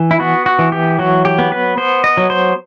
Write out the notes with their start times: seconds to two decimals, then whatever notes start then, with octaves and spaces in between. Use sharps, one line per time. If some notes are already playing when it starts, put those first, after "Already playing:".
Already playing: E3
0.11 E4
0.20 B3 F#4
0.46 F#4
0.59 E3
0.72 G4
0.99 F#3 F#4
1.25 G4
1.39 B3
1.52 B4
1.77 B3 C5
2.04 D#5
2.17 F#3
2.30 C5